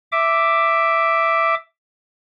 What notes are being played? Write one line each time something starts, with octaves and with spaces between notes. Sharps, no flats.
E5 D6